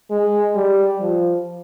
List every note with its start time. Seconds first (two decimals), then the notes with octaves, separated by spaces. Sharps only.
0.11 G#3
0.56 G3
1.01 F3